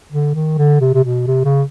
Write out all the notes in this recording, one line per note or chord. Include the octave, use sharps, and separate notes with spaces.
D3
D#3
D3
C3
C3
B2
C3
C#3